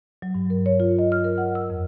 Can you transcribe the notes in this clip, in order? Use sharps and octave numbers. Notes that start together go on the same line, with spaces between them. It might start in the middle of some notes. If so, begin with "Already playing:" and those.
F#3
G2
A#4
C#5
F4
D#5
F6
A#4
F#5
E6
F2